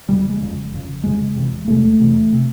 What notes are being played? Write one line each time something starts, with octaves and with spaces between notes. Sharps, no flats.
F#1 F2 C#3 G3
G3
G#3
F#1 F2 C#3
F#1 F2 C#3
F#1 F2 C#3 G#3
F1 E2 C3
F1 E2 C3 A3
F1 E2 C3
C3